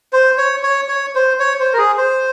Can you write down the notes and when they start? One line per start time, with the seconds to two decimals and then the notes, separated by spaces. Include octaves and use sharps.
0.13 C5
0.38 C#5
0.63 C#5
0.88 C#5
1.15 C5
1.40 C#5
1.60 C5
1.73 A#4
1.78 G#4
1.98 C5